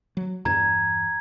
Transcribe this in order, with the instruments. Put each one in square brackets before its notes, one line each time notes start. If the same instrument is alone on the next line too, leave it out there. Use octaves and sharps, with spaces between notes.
[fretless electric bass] F#3
[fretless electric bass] E2 G2 [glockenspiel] A#5 G#6